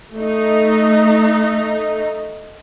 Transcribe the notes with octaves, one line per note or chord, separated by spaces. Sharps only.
A3 D#4